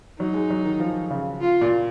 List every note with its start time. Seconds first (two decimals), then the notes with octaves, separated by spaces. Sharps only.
0.19 F#3 D#4
0.34 G#3
0.50 F#3
0.65 D#3
0.80 F3
1.10 C#3
1.41 F4
1.61 A#2